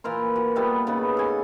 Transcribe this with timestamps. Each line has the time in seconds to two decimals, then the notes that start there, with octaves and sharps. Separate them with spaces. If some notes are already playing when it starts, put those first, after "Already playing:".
0.04 A#2 E3 A#4 C6
0.36 F#4
0.56 A#2 G3 A3 B3
0.87 C#3 B3 D#4 B4
1.17 A4 G#5